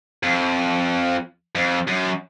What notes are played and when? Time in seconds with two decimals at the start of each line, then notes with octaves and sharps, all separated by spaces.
0.23 F2
1.55 F2
1.88 F#2